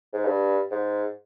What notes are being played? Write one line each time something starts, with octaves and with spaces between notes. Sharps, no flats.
G#2
G2
G#2